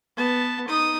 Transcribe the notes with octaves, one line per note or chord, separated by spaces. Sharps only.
B3 A5
D#4 D#6